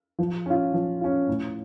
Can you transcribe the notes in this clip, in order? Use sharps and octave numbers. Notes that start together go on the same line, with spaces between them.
F3
C#4 F4
F3
C#4 F4
A2